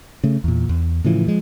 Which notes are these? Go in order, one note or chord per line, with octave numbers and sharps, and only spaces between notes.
C#3 A3
E2 A#2
E2
A2 C#3 E3 F3
F3 G#3